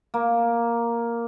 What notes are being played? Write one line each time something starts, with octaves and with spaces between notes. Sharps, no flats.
A#3